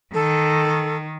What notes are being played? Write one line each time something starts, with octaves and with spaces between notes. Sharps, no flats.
D#3 A4